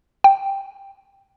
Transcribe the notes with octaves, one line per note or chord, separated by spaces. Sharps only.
G5